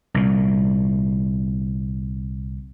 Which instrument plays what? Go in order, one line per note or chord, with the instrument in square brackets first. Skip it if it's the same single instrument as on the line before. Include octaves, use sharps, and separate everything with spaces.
[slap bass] C2 A#2